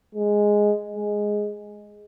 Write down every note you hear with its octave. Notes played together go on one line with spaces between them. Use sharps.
G#3
G#3